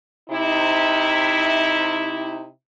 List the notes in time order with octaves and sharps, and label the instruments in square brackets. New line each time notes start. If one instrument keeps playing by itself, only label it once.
[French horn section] C3 D#4 E4